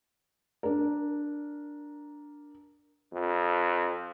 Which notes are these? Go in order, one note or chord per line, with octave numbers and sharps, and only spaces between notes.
D4 A#4
F2